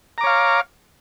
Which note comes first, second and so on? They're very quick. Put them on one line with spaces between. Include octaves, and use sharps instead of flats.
A#5 D6 C#5 F5